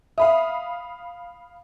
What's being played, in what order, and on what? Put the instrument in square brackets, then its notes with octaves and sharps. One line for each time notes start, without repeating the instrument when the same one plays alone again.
[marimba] E5 [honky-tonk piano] F5 B5 D#6